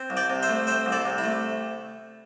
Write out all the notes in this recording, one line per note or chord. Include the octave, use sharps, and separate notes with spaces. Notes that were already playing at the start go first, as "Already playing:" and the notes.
Already playing: C4
C2
D5 G5
C3
C5 E5
A3
C4 C5 E5
C2
A4 D5
C3
E4
A3